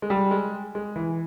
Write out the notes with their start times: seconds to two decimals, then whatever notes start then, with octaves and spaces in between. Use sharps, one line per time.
0.02 G#3
0.10 G3
0.31 G#3
0.75 G#3
0.96 E3